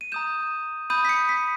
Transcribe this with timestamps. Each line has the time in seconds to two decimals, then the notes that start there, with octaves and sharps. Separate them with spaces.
0.01 D#7
0.12 A#5 D#6 G6 E7
0.90 B5 D#6 G6 D#7
1.05 B6
1.09 C#7
1.29 B6